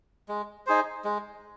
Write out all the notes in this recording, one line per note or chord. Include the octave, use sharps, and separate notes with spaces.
G#3
D#4 G#4 C5
G#3